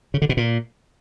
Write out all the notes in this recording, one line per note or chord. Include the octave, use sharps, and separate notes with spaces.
C#3
D3
B2
A#2